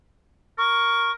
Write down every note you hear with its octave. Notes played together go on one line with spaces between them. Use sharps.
A#4 C#6